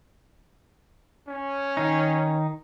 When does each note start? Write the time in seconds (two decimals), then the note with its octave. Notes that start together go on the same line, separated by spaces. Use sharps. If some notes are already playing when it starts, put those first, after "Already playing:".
1.28 C#4
1.77 D#3 D#4